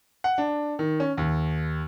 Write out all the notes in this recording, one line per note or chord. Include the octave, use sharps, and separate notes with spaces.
F#5
D4
D#3
C#4
D#2